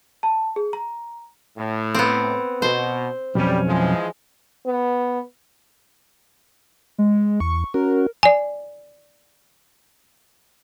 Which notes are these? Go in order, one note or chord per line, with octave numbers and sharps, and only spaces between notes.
A5
G#4
A#5
A2
B3 C4
B2 C5
B1 F2 G3 C#4
E3 F3 G#3
B3
G#3
E2 C#6
C#4 F#4 A#4
D5 G#5